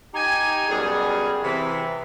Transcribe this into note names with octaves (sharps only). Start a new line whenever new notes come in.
D#4 G4 G#5
F#2 B2 G3 G#4
C3 E3